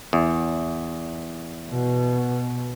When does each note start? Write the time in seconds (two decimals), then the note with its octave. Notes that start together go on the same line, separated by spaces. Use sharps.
0.13 E2
1.71 B2